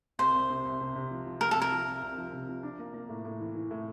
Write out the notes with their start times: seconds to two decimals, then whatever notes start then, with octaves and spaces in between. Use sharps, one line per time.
0.19 C2 C5
0.34 C2
0.50 C3
0.65 C2
0.80 C3
0.95 C3
1.11 F3
1.26 F3
1.41 F3 A#4
1.51 A4
1.56 C2
1.62 A#4
1.72 F3
1.87 C2
2.03 C2
2.18 F3
2.33 C3
2.48 F3
2.63 D4
2.79 A#3
2.94 A#3
3.09 A2
3.25 A2
3.40 E3
3.55 E3
3.71 A2